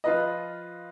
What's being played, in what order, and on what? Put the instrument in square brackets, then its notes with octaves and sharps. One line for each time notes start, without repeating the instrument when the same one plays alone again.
[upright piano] F3 F4 B4 D#5